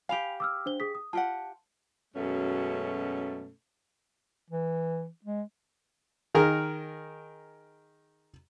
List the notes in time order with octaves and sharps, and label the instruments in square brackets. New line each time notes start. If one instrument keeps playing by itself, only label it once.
[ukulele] G4 F5 [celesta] G#5 B5 F7
[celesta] D6 E6 F6
D4 C5 G7
G#4 D#6 B6
D#6
[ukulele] F4 G4 F#5 [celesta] A5
[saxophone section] F#2 B2 G#3 A3 C#4
[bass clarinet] E3
G#3
[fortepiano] D#3 G#4 A#4 F6